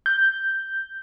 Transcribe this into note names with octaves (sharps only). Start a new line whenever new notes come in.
G6